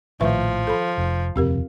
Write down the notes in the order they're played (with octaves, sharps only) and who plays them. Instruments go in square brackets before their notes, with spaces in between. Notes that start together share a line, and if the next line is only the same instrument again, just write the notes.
[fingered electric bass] A#1 A2 [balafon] D#3 B4 E5 [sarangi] F3
[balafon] A4 B5
[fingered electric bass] F1
[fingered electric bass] D#1 F2 C3 [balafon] C4 G4 A#4